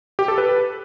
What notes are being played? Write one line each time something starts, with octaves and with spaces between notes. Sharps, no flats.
G4
A4
B4